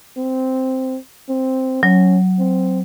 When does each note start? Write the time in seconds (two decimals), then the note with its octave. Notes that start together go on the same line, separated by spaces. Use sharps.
0.17 C4
1.29 C4
1.83 F#3 C#4
2.39 C4